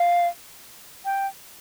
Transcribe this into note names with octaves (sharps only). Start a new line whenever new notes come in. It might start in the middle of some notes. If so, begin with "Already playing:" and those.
Already playing: F5
G5